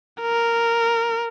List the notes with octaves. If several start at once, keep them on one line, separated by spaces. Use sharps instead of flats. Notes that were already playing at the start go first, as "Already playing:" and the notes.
A#4